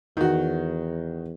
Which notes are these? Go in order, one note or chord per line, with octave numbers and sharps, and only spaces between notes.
E2 D#3 F#4